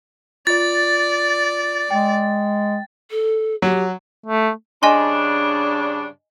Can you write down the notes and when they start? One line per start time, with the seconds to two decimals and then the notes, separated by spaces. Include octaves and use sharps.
0.47 F4 D5 A6
1.90 G#3 G5
3.10 A4
3.62 F#3 G4
4.26 A3
4.83 G2 C#3 D4 D#5 G#5 C6